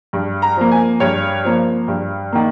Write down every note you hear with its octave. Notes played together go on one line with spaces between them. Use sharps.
G2
A#5
F3 A#3
G#5
G2 C#5
F3 A#3
G2
D#3 A#3